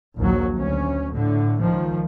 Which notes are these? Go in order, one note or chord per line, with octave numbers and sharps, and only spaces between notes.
A#1 D#2 F#3
D2 C#4
A2 D3
C#2 D#3 F3